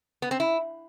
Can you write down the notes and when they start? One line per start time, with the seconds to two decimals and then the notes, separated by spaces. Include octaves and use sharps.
0.22 B3
0.31 C4
0.40 E4